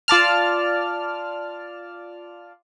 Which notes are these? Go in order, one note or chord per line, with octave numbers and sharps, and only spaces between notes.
F4 D5 A5 F6